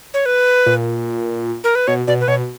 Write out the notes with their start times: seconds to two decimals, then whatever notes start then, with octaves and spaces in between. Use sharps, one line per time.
0.14 C#5
0.26 B4
0.66 A#2
1.64 A#4
1.75 B4
1.87 B2 C#5
2.07 B2 D5
2.21 B4
2.28 B2 C#5